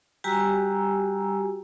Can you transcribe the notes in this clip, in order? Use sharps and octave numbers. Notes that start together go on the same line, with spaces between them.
G3 F#4 G4 G#5 A#5 E6